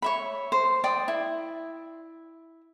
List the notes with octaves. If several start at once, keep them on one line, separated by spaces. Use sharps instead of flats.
C#5 E5 B5
C5
D5 G5 D#6
E4